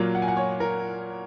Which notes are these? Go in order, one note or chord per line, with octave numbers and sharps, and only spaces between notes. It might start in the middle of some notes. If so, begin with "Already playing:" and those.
Already playing: A#2 F#3 A#3
F#5
G#5
F#5
C#5
A#4